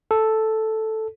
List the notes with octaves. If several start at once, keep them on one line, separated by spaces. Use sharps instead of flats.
A4